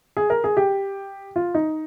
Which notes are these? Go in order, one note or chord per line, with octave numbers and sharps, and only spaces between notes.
G#4
A#4
G#4
G4
F4
D#4